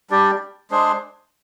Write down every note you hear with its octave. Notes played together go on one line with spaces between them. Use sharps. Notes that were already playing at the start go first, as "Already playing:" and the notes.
G3 D4 G4 D5
G#3 D4 G#4 C5